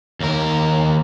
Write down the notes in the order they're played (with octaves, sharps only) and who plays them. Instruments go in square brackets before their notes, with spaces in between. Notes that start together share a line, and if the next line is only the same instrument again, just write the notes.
[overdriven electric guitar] D#2 A#4